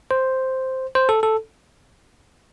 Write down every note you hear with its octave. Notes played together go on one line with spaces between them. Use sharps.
C5
C5
A4
A4